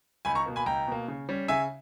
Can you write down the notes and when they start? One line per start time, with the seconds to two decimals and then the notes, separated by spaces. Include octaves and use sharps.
0.25 C#2 G#5 B5
0.35 A#5 C#6
0.46 B2 A#3
0.56 G#5 B5
0.66 C#2 G5 A#5
0.87 B2 A#3
1.08 C#3
1.29 G3 C#4
1.48 C#3 E5 G#5